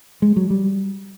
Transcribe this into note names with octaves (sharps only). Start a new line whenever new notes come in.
G#3
F#3
G3